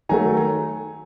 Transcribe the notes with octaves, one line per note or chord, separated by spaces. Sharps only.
D#3 F#3 A3 G#5 A#5